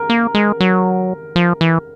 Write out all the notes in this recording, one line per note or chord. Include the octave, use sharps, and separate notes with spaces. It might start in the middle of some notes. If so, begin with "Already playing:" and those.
Already playing: A#4
A#3
G#3
F#3
F3
E3